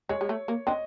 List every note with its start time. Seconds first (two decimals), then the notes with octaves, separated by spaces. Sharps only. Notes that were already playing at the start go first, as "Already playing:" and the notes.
0.09 G#3 C#5
0.21 G#3
0.29 A3
0.48 A#3
0.67 C4 D4 D#5